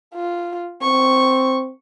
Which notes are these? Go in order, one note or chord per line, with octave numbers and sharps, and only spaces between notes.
F4
C4 C#6